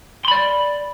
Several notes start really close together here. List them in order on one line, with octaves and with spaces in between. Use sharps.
C6 B5 D5